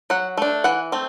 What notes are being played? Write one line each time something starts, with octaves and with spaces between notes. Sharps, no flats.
F#3 F#5
A3 D4
E3 F#5
A3 C4